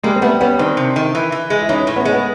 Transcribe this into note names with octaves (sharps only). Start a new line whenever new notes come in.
G3 G#3 A#3
C4
G3 A3 B3
G3 B3 C#4
D#3 C4 D4
C3
D#3
E3
E3
G#3
E4
E3 C#4 D#4
A2
B3 C#4
G#3
B3